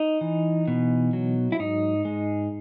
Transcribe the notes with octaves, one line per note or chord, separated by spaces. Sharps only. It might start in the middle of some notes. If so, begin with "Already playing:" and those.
Already playing: D#4
E3
B2
F#3
E4
G#2 D#4
G#3